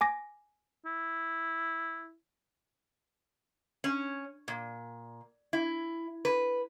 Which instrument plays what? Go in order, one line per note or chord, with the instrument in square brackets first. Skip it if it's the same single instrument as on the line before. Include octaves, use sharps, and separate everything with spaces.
[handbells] G#5 D6 A#6
[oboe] E4
[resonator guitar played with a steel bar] C#4
A#2
E4
B4